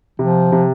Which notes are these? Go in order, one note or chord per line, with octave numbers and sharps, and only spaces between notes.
C3 F3
C3